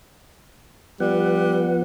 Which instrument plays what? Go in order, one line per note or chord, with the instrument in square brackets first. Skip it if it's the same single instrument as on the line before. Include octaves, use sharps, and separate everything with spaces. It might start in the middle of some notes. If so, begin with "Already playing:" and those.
[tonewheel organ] F3 B3 F#5 [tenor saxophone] G3